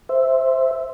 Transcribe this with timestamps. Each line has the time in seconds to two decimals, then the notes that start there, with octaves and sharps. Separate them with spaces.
0.09 C5 E5